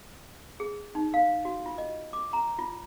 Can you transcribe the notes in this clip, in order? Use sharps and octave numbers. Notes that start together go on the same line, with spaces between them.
G#4
D#4
F5
F#4
F4
D#5
D6
A#5
F4